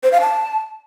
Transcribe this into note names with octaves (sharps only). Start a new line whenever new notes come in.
C5
F5
A5